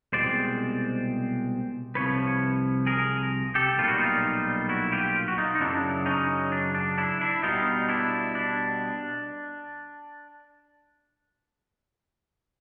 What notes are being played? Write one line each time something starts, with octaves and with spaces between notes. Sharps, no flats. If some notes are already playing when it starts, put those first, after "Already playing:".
C2 B2 G#3 C4 C5 D5
C2 C3 F3 B4 C#5
G#4 A#4
G4 A4
B1 A#2 G3 F4
F#4
D#4 F4
E4 F#4
F4 G4
F#4
D#4 F4
D#4
F#2 C#3 F#3 D4 E4
C#4 D#4
D4
D4
D4 E4
D4 E4
B2 G3 B3 D#4 F4
D4 E4
D4